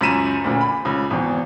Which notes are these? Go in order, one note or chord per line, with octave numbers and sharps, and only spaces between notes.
C#2 F#2 A#5 B6 D#7 E7
D2 A#2 C#3
B5
C#2 C#3
G#1 E2